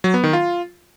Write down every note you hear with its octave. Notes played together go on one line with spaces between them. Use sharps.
F#3
B3
D#3
F4